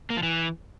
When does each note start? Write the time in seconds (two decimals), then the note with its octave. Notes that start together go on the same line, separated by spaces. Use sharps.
0.10 A#3
0.17 F3
0.23 E3